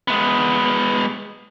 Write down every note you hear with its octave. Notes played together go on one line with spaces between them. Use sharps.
G#3 B3